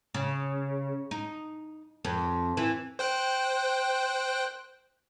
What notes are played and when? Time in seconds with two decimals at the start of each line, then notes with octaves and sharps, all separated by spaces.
0.14 C#3
1.11 D#4
2.05 F2
2.57 E3
2.99 C5 G5 F#6